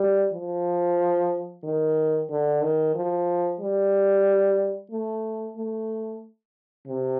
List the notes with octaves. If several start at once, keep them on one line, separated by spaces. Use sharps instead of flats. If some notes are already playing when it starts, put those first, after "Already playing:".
Already playing: G3
F3
D#3
D3
D#3
F3
G3
A3
A3
C3